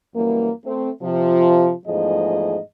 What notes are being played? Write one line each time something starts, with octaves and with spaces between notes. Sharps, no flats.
F#2 E3 G3 A#3
A3 C4
C3 F3
E2 G#2 F3 A3 G#4 D#5